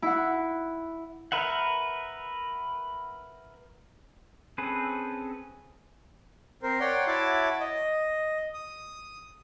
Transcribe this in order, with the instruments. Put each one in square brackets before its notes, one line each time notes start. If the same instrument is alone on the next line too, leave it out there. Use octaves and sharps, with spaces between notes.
[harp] E4 F#5
[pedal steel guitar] A#4 B4 E5 F#5
C4 C#4 G#4 A4 B4
[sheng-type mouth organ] C4 A#4 C5
C#5 D5 F#5 G5 C6
E4 F#4 C#5 E5 A5 D6
D#5
D#6